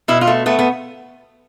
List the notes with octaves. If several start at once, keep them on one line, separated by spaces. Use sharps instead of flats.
B2 E4
F4
A3
A3 B3
B3